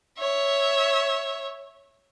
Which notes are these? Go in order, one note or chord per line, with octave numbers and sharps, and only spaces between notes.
C#5 E5